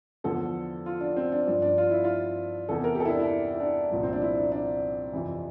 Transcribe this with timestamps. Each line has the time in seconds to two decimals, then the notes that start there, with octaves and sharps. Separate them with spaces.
0.24 E2 D3 F3 A4
0.86 F4
1.01 D4
1.17 C4
1.32 D4
1.47 G2 F3 D4
1.62 D4
1.78 F4
1.91 E4
2.04 F4
2.69 E2 C3 E3 A4
2.84 A#4
2.95 G4
3.00 A4
3.05 E4
3.10 D4
3.20 E4
3.54 E4
3.60 D4
3.91 C2 A#2 F3
4.03 C4
4.13 D4
4.22 E4
4.37 D4
4.52 D4
5.13 F2 C3 E3